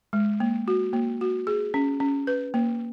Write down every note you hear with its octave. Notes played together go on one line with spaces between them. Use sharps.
G#3
A#3
F#4
A#3
F#4
G#4
C#4
C#4
B4
A#3